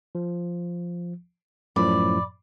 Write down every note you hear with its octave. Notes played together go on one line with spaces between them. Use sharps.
F3
F#2 A2 F3 D5 B5